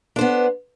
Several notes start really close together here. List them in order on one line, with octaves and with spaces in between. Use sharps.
D4 C5 B3